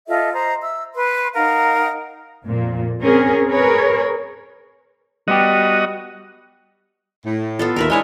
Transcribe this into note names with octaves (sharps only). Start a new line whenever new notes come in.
F4 A4 D#5 E5
C5 D#5 A#5
E5 E6
B4 C6
D#4 A#4 F5 F#5
F2 A#2
C4 C#4 G#4 A#4
G#4 A#4 B4 C#5
G3 B3 F#4 G4 D#5
A2
B3 F4 A4
D#2 A#4 B4 E5
E3 G#3 D4 C#5 D#5